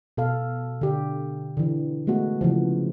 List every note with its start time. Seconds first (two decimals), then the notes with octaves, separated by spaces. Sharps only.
0.17 B2 A4 F5
0.81 D3 G4
1.57 D3 E3
2.07 G#3 A3 B3 F#4
2.41 C#3 E3 F3